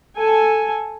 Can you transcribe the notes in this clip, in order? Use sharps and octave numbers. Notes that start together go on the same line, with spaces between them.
A4 G#5